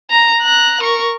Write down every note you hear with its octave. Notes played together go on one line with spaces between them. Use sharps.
A#5
A#5 F#6
A#4 C#6